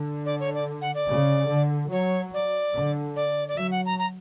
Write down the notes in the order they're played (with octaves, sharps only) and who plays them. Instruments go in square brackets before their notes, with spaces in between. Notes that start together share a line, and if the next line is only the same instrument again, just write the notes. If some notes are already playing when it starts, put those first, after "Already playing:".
Already playing: [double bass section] D3
[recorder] D5
C#5
D5
F#5
D5
[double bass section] C#3
D3
[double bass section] F#3 [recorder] C#5
[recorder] D5
[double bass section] D3
[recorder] D5
D5
[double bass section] F#3 [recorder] E5
[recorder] F#5
A#5
A#5